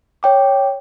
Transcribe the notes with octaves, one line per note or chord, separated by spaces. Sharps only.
C#5 G5 D6